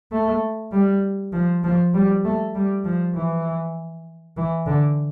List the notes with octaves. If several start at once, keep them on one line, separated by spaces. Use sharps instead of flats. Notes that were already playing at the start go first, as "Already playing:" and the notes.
A3
G3
F3
F3
G3
A3
G3
F3
E3
E3
D3